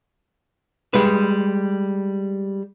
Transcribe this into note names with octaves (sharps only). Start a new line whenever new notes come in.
G3 G#3 B4